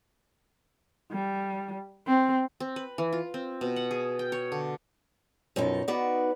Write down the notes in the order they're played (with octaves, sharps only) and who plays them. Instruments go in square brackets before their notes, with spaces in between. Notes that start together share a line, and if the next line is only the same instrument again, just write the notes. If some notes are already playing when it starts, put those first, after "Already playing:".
[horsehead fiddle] G3
C4
[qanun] C4
B4
E3
F4
C4
B2
F#5
G#4
G5
C#5
D3
[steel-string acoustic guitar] F#2 B2 F3 D#4
B3 D#4 F#4 B4 D5